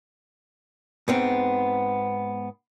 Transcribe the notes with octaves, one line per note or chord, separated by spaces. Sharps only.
G#2 B3 C4